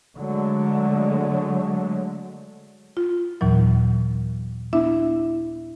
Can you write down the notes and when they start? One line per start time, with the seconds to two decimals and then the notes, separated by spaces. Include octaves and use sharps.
0.17 D3 F#3 G#3 A3
2.97 F4
3.41 D#2 A#2 E3 F#3
4.73 B3 D4 E4 E5